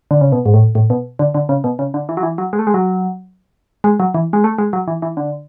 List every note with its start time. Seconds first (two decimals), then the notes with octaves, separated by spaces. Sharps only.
0.11 D3
0.21 C#3
0.32 B2
0.46 G#2
0.54 A2
0.75 A2
0.90 B2
1.19 D3
1.34 D3
1.49 C#3
1.64 B2
1.79 C#3
1.94 D3
2.09 E3
2.17 F#3
2.23 E3
2.38 F#3
2.53 G#3
2.59 A3
2.67 G#3
2.74 F#3
3.84 G#3
4.00 F#3
4.14 E3
4.33 G#3
4.44 A3
4.58 G#3
4.73 F#3
4.88 E3
5.02 E3
5.17 D3